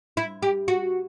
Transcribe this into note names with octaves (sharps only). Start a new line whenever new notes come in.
E4
G4
F#4